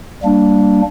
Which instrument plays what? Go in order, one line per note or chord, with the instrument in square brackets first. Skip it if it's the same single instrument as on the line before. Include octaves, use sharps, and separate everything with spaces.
[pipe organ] G3 A#3 D4